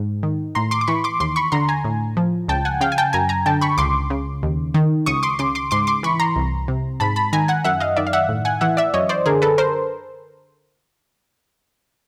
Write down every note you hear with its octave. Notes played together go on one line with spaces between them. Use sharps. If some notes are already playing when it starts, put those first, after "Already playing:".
Already playing: G#2
D#3
A2 A#5 C6
C6 D6
D6
E3 B5 C#6
C6 D6
D#2 C6 D6
B5 C#6
D3 A#5 C6
G#5 A#5
A2
F3
C#2 G5 A5
F#5 G#5
C#3 F5 G5
G#5
G5 A5
F#2 G#5 A#5
G#5 A#5
D3 G5 A5
B5 C#6
C#2 C6 D6
C#3
D#2
D#3
C#2 C#6 D#6
C6 D6
C#3 C6 D6
C6 D6
G#2 C6 D6
C6 D6
E3 B5 C#6
A#5 C6
C2
C3
G#2 A5 B5
A5 B5
D#3 G#5 A#5
F#5 G#5
F#2 E5 F#5
D#5 F5
D#3 D5 E5
F5
E5 F#5
A2
F#5 G#5
E3 E5 F#5
D5 E5
F#2 C#5 D#5
C5 D5
D3 G#4 A#4
A4 B4
A#4 C5